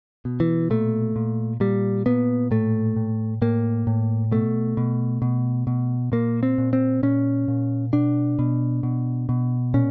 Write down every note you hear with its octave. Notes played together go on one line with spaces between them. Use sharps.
B2
E3
A#2 A3
A#2
A#2 G3
A#2 B3
A2 A3
A2
A2 A#3
A2
B2 A3
B2
B2
B2
A#2 A#3
C4
A#2
C4
A#2 C#4
A#2
B2 D4
B2
B2
B2
A#2 C#4